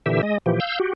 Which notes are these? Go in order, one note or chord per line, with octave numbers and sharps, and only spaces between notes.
A#2 D3 E3 G4 E5
G#3 D#5
A#2 E3 F3 G4
F5 E6 G6
F#4 G4